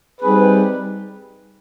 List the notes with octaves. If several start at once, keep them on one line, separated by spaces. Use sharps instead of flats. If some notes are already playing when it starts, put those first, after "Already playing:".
G3 C4 D#4 G#4 B4